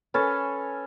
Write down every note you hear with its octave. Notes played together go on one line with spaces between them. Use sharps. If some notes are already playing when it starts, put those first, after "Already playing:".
C#4 A4 B4 A6